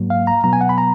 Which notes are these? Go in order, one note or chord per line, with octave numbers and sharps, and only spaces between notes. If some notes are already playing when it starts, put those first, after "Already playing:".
Already playing: G#2 F#3 A#3
F5
A#5
B2 F#3 B3 A#5
G#5
F#5
B5
A#5